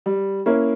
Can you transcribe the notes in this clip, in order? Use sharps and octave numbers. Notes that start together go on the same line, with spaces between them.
G3
A#3 C#4 E4 A#4